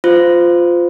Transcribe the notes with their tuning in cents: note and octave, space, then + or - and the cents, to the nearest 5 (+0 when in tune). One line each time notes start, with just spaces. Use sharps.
F4 +0 C5 -25